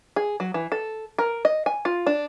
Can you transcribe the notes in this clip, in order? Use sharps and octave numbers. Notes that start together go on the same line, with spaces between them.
G#4
F#3
E3
A4
A#4
D#5
G#5
F4
D4